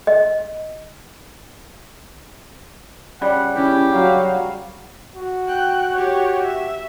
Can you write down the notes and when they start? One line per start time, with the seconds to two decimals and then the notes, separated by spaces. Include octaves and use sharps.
0.07 D#5
3.21 C#3 G3 F#5
3.55 C#4 E4 G4
3.93 F#3 F#4 F5
5.16 F#4
5.47 G5 F#6
5.95 G4 C#5
6.43 E5